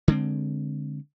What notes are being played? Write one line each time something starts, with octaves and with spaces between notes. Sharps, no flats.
D3 G#3 C4